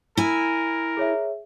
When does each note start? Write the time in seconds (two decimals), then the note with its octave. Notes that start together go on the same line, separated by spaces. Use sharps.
0.17 E4 A#4 G#5
0.97 G#4 C#5 E5